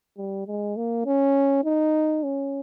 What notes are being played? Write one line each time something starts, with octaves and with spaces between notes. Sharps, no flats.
G3
G#3
A#3
C#4
D#4
C#4